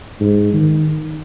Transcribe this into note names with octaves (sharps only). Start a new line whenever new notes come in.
G#2
D#3